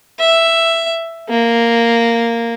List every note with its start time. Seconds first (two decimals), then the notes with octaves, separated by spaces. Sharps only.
0.19 E5
1.29 A#3